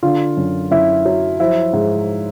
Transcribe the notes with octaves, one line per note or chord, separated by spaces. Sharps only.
D3 F4
F#2
F#2 E4
F#3
F3 E4
G#2